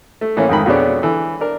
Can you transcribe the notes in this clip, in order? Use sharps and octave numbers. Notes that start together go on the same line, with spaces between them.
A3
A2 E3 A3 A#3 C#4
F2 G#2 D#3 B5
F2 B2 G#3 B3 C#4 D4
D3 E3
D4 A#4